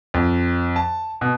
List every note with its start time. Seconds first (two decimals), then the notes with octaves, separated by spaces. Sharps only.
0.14 F2
0.76 A5
1.21 B2